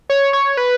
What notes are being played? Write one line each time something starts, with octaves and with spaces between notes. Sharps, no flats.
C#5
C#5
B4